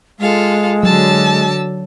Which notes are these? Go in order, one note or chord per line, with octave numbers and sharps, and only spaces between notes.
G#3 F4 A4 F5
D3 F#3 A5 E6